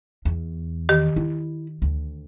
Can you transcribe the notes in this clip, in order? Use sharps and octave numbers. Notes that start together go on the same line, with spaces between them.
E2
D#3 G4
E4
D2